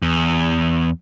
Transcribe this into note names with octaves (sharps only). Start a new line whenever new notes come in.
E2